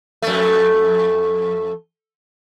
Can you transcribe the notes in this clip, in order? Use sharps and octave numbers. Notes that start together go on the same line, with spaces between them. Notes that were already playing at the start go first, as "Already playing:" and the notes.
F2 A3